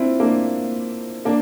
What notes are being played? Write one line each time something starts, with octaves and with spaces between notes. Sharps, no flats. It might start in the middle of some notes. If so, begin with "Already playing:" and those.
Already playing: C4 D4 E4 F4
A#3 D4
A#3 D4